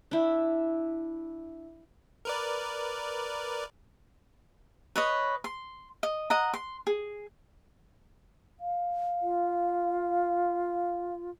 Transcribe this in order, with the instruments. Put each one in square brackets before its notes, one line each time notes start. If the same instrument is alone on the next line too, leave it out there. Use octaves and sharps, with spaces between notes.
[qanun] D4 E4
[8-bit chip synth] A#4 B4 D5
[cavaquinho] B4 C#5 D#5
C6
D#5
D#5 F#5 A#5
C6
G#4
[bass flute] F5
[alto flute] F4